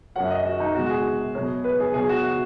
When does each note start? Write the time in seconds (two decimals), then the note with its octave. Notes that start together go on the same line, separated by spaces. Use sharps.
0.16 F#2 F#3 F#5
0.30 D#5
0.45 F#4
0.60 D#4
0.75 B2 G#3 F#4
0.86 F#4
0.90 G#4
1.35 B2 F#3
1.64 B4
1.80 G#4
1.94 B2 F#3 G#4
2.09 F#4
2.24 F#4